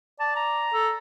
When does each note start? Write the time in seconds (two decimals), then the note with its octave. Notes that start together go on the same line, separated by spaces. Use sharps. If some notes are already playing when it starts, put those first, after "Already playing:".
0.20 D5 A5
0.36 A#5
0.73 A4